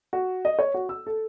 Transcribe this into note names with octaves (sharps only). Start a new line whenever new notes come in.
F#4
D#5
C#5
F#4
E6
A4